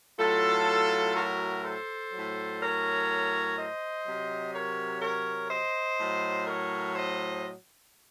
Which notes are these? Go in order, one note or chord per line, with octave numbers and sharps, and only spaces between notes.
A2 F#3 F4 A4
F#4 A#4
A4 C5
A2 F#3
A#4 C#5
C5 D#5
C3 F#3
A#4 C#5
A#4 C#5
C5 D#5
A2 F#3
A#4 C#5
C5 D#5